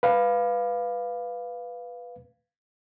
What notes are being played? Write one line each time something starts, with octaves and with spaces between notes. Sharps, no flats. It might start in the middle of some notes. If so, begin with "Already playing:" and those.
B4 F5